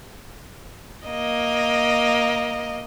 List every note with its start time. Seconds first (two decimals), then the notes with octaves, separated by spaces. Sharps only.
1.07 A#3 D#5